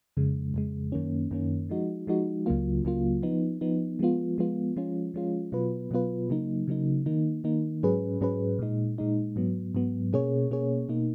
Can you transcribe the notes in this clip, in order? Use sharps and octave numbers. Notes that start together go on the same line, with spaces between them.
F2 C#3 G#3
F2 C#3 G#3
F#2 D#3 A#3 C#4
F#2 D#3 A#3 C#4
F3 G#3 D#4 F#4
F3 G#3 D#4 F#4
C#2 C#3 F#3 A#3 F4
C#2 C#3 F#3 A#3 F4
F3 B3 D#4
F3 B3 D#4
F3 G#3 B3 F4
F3 G#3 B3 F4
F3 G#3 C#4 F4
F3 G#3 C#4 F4
B2 F#3 B3 F4 B4
B2 F#3 B3 F4 B4
C#3 F#3 A#3 D#4
C#3 F#3 A#3 D#4
D#3 A#3 D#4
D#3 A#3 D#4
G#2 F#3 C#4 G#4 B4
G#2 F#3 C#4 G#4 B4
A#2 G#3 D#4
A#2 G#3 D#4
G#2 F#3 B3
G#2 F#3 B3
B2 A#3 C#4 G#4 C#5
B2 A#3 C#4 G#4 C#5
B2 A#3 D#4